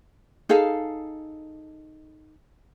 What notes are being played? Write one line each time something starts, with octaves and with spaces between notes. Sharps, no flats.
D#4 G#4 A4 F5